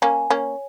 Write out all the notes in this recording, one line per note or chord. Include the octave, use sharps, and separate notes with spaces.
A#3 C#4 G#5
A#3 C#4 C#5